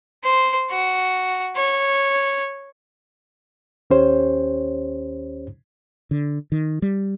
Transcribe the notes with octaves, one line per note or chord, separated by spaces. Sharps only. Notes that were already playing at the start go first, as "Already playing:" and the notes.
C5
F#4
C#5
D#2 C#4 G4 C5 C#5
D3
D#3
G3